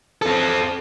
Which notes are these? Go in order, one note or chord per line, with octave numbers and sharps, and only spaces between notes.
C4 A4